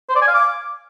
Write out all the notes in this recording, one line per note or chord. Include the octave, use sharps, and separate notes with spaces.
C5
D5
G#5
F5
D6